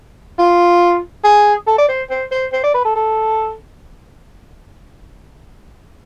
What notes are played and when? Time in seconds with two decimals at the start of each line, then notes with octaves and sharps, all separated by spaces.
0.39 F4
1.24 G#4
1.67 A4
1.78 D5
1.88 C5
2.10 C5
2.31 C5
2.53 C5
2.64 D5
2.74 B4
2.85 A4
2.96 A4